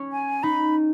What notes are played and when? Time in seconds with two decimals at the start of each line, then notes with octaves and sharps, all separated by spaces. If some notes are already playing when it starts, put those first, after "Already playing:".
Already playing: C#4
0.12 G#5
0.43 D#4 B5